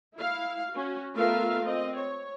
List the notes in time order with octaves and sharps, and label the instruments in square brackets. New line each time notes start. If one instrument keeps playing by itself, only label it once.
[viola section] E4 F5
C#4 F#4
A3 B3 F4 A#4 E5 F5
C4 D#5
C#5